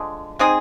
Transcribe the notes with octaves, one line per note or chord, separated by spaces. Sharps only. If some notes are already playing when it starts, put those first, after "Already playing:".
Already playing: D3 F3 G#3
G#3 C4 D#4 G#4